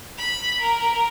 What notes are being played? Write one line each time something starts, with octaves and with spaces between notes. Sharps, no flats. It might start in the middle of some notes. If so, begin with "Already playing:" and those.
B5
A#4